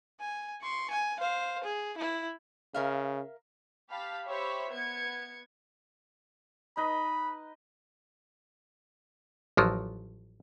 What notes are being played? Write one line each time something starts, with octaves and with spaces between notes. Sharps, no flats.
G#5
C6 C#6
G#5
C5 F5
G#4
E4
C#3 A#4 E5 F5
G4 F5 A5 B5
G4 C5 C#5 E5 B5 C#6
B3 G#6 C#7
D#4 B4 D#5 B5
A1 F3 F#3